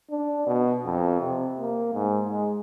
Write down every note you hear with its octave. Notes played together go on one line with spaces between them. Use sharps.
D4
B2
F2
C3
A#3
G#2
G#3